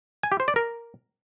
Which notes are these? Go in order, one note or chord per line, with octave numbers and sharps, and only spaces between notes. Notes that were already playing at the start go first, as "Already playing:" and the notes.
G#5
G4
C5
D5
A#4